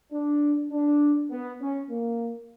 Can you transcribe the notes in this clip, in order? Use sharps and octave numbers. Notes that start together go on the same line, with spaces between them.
D4
D4
B3
C#4
A#3